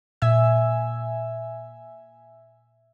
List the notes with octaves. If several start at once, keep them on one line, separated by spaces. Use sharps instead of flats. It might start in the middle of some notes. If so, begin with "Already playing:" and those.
A#2 E5 G#5 E6